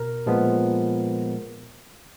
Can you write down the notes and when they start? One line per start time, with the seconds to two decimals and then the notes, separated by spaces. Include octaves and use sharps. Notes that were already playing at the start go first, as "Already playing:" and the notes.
Already playing: B2 A#4
0.26 A#2 F3 G#3 B3